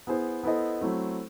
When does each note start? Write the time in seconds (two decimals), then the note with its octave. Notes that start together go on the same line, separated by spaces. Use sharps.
0.07 B3 E4 G#4 C5
0.43 B3 E4 A4 C5 D#5
0.81 F#3 A3 C4 E4